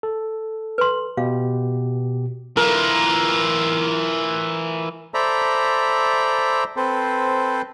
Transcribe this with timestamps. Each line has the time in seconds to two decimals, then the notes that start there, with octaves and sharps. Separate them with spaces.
0.03 A4
0.78 B4 C6
1.17 B2 G4 F5
2.57 E3 F4 A#4
5.14 A4 C5 D5 E5 A#5 B5
6.77 C4 A4 B4 C5